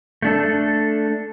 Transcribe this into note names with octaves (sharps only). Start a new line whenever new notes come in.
A3 D4 A4